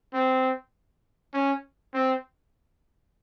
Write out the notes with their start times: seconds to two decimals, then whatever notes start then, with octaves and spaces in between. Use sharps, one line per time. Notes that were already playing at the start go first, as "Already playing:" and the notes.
0.13 C4
1.33 C#4
1.94 C4